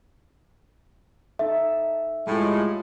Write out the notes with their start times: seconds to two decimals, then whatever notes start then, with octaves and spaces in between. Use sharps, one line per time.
1.39 D#4 A4 E5
2.27 A2 G3 G#3 F4